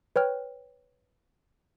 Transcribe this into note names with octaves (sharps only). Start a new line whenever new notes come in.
B4 C#5 G5 F6